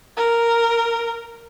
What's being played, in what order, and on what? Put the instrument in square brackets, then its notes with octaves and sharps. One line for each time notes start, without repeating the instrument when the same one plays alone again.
[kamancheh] A#4